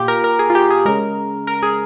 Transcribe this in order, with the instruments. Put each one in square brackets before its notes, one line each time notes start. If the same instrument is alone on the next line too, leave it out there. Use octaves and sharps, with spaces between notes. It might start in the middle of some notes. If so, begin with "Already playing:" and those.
Already playing: [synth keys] A#2 F4 G4
A#4
A#4
G#4
F4
G4
G#4
C#3 G#3 A#4
A#4
G#4